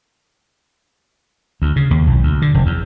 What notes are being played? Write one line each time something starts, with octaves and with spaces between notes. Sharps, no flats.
D2
C#3
D#2
B1
D2
D3
F1
E2